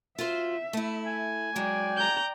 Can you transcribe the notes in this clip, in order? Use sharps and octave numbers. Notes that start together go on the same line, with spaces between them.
F4 F#4 C5 E5
A3 E4
G#5
F#3 G#3 D5 G5
A#5 G6